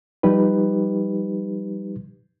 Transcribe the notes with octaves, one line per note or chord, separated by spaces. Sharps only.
F3 G3 D#4 G4 B4